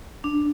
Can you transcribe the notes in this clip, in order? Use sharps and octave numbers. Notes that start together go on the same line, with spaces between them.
D4